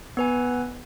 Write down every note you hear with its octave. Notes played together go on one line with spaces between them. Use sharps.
B3 B4 G#5